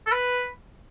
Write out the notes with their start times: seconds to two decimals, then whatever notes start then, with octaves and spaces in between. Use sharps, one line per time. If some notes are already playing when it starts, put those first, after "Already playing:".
0.07 A4
0.12 B4